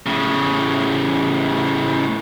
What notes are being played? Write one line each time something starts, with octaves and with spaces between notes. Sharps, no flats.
A2 C#3